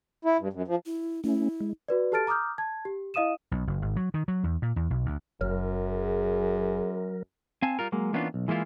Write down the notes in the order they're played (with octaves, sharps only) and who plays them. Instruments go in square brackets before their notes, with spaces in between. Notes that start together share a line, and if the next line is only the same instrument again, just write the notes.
[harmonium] E4
G2
F#2
F3
[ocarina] E4
[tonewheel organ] A3 C#4 [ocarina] E4
[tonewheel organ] G#3
[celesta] F#4 B4 D5
G4 A4 A5 F6 A6 D7
A#5 D6 D#6 F6 G6
A5 G#6
G4
E4 D#5 F5 D#6 D#7 E7
[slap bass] B1
F#1
G#1
F#3
D#3
F#3
E2
A#2
E2
B1
D2
[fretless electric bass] F#1 [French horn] F#2 [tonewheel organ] F#3 A#4
[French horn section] G#4
[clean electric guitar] C4 F5 G#5 A5
G3 F4 A#4
F#3 G#3 A#3
E3 A#3 B3 C#4 D4 F4
B1
E3 G#3 A#3 E4 F4